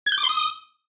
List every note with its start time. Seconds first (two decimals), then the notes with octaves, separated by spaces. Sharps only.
0.06 G#6
0.12 G6
0.18 D6
0.23 C6
0.29 D#6